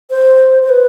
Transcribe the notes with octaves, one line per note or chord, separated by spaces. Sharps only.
C5
C5
B4